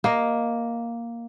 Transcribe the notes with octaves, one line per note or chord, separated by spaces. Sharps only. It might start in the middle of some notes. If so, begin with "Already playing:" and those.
A#3 D#5